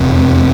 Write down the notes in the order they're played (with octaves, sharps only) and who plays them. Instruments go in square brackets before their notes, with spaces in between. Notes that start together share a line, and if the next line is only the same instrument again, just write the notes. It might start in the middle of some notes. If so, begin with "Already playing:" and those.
Already playing: [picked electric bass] F1 E2 C3